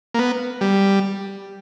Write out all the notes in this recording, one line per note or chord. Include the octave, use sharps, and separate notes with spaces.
A#3
B3
G3